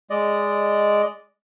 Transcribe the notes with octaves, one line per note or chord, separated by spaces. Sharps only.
G#3 D5 D#5